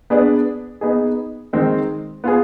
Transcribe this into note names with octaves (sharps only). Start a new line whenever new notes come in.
B3 D4 G#4 B4 D5
B3 D#4 G#4
D#3 G#3 C4 D#4
B3 F4 G#4